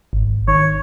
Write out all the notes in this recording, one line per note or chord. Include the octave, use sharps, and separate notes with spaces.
G#1
D#3 C#5